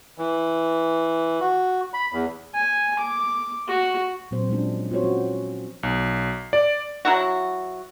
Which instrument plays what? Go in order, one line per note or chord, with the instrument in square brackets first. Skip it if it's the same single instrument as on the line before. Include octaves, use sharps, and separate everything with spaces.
[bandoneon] E3
F#4
B5
E2
[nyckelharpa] G#5
D6
F#4
[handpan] A#2 F#3 C4 C5
F3 G#3 C#4 D4
C4 F4 F#4 C5 C#5
F3 C#4 F#4
[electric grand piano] B1
D5
[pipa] F#3 E4 F#4